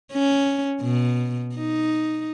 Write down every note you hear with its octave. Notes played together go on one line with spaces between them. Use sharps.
C#4
B2
D#4